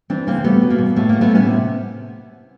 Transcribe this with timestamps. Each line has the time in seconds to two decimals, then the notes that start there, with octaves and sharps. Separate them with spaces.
0.10 E3 C4 D4
0.27 C#3 A#3 C4
0.44 G3 A3 B3
0.62 B2
0.70 A#3
0.78 B2
0.96 A2 A3
1.09 A3 A#3
1.21 A3 B3
1.31 A2 B3 C#4
1.48 C3